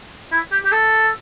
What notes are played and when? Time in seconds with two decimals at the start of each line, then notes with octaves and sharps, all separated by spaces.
0.32 E4
0.52 G4
0.65 G4
0.72 A4